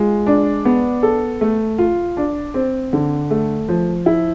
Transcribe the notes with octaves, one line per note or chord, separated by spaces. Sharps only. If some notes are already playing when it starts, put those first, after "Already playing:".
Already playing: G#3 F4
D4
B3
A4
A3
F4
D4
C4
D3
A3
F3
E4